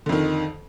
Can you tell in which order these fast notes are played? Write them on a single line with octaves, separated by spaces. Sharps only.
D3 F2 D#3